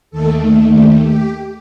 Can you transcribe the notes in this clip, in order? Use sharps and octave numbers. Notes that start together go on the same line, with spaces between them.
D#2 D#3 A3 A4
G4
G4